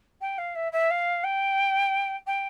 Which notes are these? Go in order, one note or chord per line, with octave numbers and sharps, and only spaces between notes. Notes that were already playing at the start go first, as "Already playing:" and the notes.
G5
F5
E5
E5
F5
G5
G5